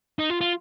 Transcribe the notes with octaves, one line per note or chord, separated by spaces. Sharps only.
D#4
F4
F4